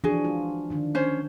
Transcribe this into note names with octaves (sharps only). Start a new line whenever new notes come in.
E3 F3 D4 F#4 G#4
G#3 F4
D3 D#3 D4
C#4 C5 C#5